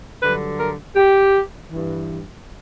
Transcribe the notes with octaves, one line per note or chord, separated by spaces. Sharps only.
G2 D3 F#3 B4
A#4
G4
G2 E3